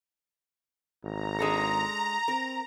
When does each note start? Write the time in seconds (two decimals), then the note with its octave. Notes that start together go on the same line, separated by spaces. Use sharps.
1.04 G#1 A#5
1.39 G#3 D4 A4
2.28 C4 A#4